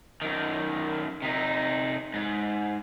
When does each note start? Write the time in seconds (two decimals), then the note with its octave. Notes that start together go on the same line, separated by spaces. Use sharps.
0.22 F#2 D#3
1.22 C3 D#4
2.14 G#2